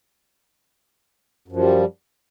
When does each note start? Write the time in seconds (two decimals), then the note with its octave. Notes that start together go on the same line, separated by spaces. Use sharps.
1.48 F#2
1.52 F3
1.56 G3